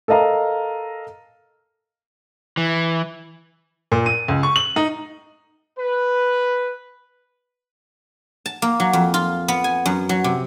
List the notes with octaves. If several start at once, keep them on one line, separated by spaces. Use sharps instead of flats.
A4 A#4 D#5 F5 A#5
E3
A#2
D#7
C#2
C#6
F#7
D#4
B4
A5
A#3
F#3
F2
F4
B3
G#5
F#2
F#3
C3